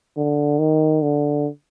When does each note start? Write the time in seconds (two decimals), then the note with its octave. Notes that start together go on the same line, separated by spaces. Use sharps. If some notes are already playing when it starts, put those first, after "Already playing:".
0.17 D3
0.59 D#3
1.02 D3